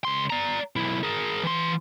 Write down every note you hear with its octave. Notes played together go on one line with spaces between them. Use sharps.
C#2 C6
D5 A#5
B1 E4
G#4 A#4
E3 C6